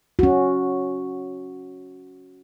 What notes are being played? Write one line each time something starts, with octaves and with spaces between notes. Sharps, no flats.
C#4 F#4